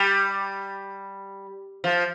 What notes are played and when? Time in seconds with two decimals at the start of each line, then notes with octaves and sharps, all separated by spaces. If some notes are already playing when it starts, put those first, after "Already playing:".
Already playing: G3
1.84 F3